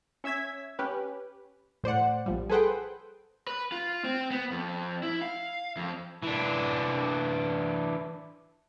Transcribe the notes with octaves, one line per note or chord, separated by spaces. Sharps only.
C#4 E5 E6 G#6 B6
C#4 G4 B4
A2 C5 D5 F#5
A#1 F3 G3
G#4 A4 B4 C5 F#5 G5
B4
F4
C4
B3
F2
E4
F5
F2
E3 D4